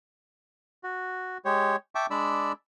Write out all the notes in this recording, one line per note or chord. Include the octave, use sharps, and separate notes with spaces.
F#4
G#3 G4 C#5
E5 G5 A5 C#6 D6
G#3 D4 D5 B5 E6